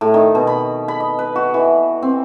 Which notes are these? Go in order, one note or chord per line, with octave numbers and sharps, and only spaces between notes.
A2
D#3
B2
B5
B5
D#5
B4
F#4
E3
C4